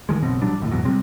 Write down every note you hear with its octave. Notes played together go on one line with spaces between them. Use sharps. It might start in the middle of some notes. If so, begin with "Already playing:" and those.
D2 D#3 F3 G#3
F#1 B1 B2 C4
A1 F#3 G3 D4
D1 G#1 D#2 A2
E2 G#2 B2 F#3
C3 G3 G#3 C4